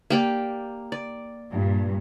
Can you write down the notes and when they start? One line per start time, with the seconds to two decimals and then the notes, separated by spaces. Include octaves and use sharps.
0.10 A#3 G4 D5
0.92 D5
1.52 G2 A#2